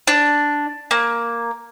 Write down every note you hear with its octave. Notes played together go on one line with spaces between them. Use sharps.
D4
A#3